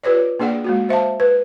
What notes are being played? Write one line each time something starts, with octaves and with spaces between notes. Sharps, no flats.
F4 G4 B4 C#5 D5
A#3 D4 G#4 D5 F#5 G5
G#3 A#3 F#4
C5 E5 F5 A5
B4